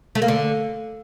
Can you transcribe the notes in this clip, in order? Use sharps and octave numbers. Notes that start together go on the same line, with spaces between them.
A3
A#3
D3